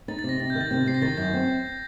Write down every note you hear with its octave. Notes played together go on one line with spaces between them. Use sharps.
D#4 A6
A6
C3
A#6
C3 A6
G6
D#3
A6
C3
C3 C7
A#6
D#3 A6
F#2 G6
C4